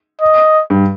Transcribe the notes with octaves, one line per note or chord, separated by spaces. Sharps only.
D#5
G2